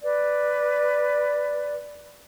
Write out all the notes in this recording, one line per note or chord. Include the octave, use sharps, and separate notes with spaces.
B4 D5